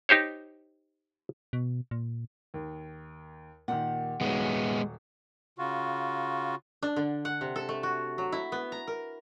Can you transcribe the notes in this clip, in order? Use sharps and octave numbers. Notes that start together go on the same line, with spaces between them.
D#4 G4 C5 C#5
B2
A#2
D#2
A#2 D#3 G4 F#5
D#1 F#3 G#3 B3
C#3 F4 F#4
D4
D3
F#5
C3
A4
A3
F#4
F#3
E4
B3
A#5
A#4